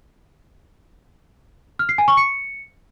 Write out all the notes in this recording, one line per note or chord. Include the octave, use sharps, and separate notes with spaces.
F6
C7
G#5
C#6
C#7